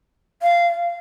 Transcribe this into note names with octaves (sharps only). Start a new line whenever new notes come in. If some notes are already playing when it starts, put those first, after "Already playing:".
F5